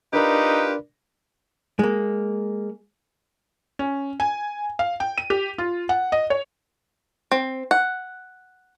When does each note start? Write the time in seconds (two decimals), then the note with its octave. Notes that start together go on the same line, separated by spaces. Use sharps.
0.13 D4 D#4 F4 G4 A#4 B4 D5
1.79 G#3 A#3
3.79 C#4
4.20 G#5
4.79 F5
5.00 G5
5.18 D#7
5.30 G4
5.58 F4
5.89 F#5
6.12 D#5
6.30 C#5
7.31 C4
7.71 F#5